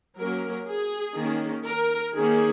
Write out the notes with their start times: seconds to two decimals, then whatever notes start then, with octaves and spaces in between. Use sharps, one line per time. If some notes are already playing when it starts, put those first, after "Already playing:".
0.17 F#3 A#3 C#4 A#4
0.68 G#4
1.16 D#3 A#3 C#4
1.66 A#4
2.16 D#3 A#3 C#4 G#4